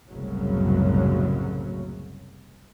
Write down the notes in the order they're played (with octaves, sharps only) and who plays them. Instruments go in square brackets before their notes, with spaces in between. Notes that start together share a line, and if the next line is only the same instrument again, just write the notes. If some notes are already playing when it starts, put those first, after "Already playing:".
[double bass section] F#1 C2 F#2 A2 C#3 F#3